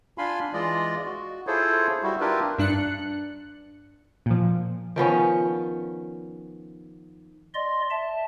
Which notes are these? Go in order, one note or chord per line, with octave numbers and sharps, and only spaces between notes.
D4 F4 F5 G#5 B5 C6
E3 G#3 F4 D5 D#5
F#4
E4 F4 G#4 A4 C5 C#5
G3 E4 F#4
D4 E4 F4 G4 A#4 B4
G2 D4 F#6 C#7
A#2 F3
D#3 F3 B3 C#4
D5 D#5 C6
E5 A5